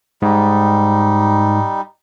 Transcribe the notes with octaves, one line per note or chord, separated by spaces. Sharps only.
G#2 G3 D#4